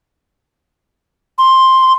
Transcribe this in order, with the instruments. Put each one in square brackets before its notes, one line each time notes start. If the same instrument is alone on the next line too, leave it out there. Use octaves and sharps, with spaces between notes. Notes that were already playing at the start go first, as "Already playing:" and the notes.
[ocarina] C6